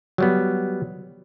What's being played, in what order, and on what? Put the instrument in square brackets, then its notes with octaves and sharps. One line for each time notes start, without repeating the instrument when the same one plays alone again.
[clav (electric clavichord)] F#3 G3 B3